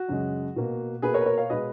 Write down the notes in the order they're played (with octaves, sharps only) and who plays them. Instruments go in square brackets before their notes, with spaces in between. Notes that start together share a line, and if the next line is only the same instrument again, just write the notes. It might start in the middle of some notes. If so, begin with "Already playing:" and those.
Already playing: [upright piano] F#4
F#2 C#3 G#3
B2 A#3
B2 A#3 G#4 B4
A#4 C#5
B4
A#4 C#5
C#5 F5
B2 G#3 B4 D#5